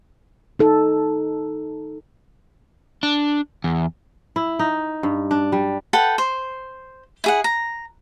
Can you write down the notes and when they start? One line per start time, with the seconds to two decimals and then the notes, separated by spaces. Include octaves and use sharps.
0.59 D#4 A4
3.03 D4
3.64 E2
4.36 E4
4.59 D#4
5.03 G2
5.31 D4
5.52 G3
5.93 A4 B4 F#5 G5
6.18 C5
7.24 E4 G#4 F#5
7.44 A#5